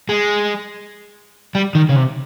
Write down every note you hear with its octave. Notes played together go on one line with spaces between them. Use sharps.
G#3
G3
D#3
C#3
C3